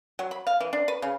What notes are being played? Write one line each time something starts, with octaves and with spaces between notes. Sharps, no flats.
F#3
B5
F5
E3
D4
B4
C#3